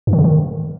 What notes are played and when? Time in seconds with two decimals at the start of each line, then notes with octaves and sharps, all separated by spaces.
0.07 G2
0.13 D#3
0.19 C#3
0.24 D#3